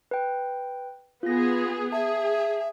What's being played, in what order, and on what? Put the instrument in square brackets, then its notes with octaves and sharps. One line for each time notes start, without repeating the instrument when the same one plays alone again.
[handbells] B4 G5
[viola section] B3 G#4 [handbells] F4 A#6
[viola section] G#4 [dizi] E5 [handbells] A5